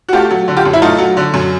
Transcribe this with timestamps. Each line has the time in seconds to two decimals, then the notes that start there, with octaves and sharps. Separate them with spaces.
0.09 F#4
0.13 A3 F4 G4
0.31 F#3
0.48 D3
0.57 F4 G4
0.65 F#2
0.73 E4
0.82 A3 D#4 F4
0.98 F#3
1.17 D3
1.34 F#2